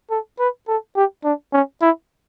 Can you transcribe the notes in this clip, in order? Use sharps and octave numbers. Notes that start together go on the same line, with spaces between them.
A4
B4
A4
G4
D4
C#4
E4